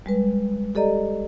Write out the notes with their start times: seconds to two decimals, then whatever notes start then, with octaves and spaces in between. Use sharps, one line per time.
0.06 G3 G#3 B4
0.75 G4 A4 D5 D#5 A#5